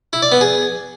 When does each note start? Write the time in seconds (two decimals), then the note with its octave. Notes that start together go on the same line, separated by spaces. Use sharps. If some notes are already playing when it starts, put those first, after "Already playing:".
0.13 E4
0.22 D5
0.32 B3
0.41 G#4